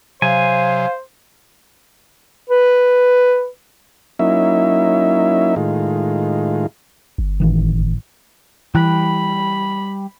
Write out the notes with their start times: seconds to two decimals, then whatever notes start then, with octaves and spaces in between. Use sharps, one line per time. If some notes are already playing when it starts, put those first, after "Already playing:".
0.22 C3 F#3 C5 F5 G#5
2.50 B4
4.19 F#3 A#3 C#4 D#4 E4 E5
5.56 A2 D#3 G#3 F4
7.18 G1
7.40 A1 D#3 E3
8.75 E3 G3 G5 B5 F#6